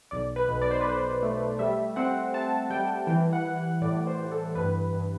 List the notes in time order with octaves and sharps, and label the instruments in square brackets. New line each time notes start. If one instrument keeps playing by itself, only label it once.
[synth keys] B1 D5
B4
B1
D5
C5
B4
B1 C5
A3
G3 E5
C4 F#5
C4 A5
G3 G5
E3 G5
F#5
E3
F#5
A2 D5
C5
E3
A4
G2 B4
G2